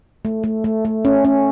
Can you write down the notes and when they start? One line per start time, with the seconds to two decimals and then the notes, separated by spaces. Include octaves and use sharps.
0.25 A3
0.44 A3
0.64 A3
0.85 A3
1.05 C#4
1.25 C#4